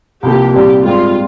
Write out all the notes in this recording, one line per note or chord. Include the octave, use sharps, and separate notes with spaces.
C2 C3 F3 A#3 G4
C2 A#2 G3 C4 G4
G#2 G3 C4 F4